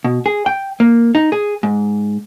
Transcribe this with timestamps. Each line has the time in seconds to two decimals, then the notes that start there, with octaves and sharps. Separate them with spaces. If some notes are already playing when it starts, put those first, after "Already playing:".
0.04 B2
0.26 G#4
0.46 G5
0.80 A#3
1.15 D#4
1.32 G#4
1.63 G#2